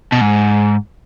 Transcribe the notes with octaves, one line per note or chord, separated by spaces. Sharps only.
B2
G#2